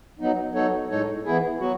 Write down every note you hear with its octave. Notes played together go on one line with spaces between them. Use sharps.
F#3 B3 D#4
F#3 B3 D#4 A4 C#5
A2 G#3 D#4 A4 C#5
E3 B3 E4 G#4
F#3 B3 F#4